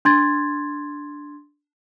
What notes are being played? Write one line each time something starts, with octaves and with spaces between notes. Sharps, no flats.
D4 C6 G#6 A6